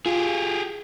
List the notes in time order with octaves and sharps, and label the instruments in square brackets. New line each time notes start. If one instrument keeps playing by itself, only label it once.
[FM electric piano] F4 [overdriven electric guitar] G4 G#4